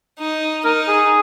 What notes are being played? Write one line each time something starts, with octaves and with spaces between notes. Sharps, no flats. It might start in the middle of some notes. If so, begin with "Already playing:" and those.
D#4
D#4 A#4
G#4